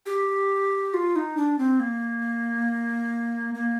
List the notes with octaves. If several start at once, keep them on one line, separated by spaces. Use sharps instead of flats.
G4
F4
D#4
D4
C4
A#3
A#3